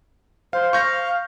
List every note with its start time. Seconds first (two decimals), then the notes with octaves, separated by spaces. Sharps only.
0.53 C5 F5
0.73 F5 C#6 G6 A#6